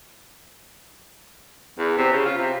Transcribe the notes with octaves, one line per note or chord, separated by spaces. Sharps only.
E2
C3
C#3
F4
C3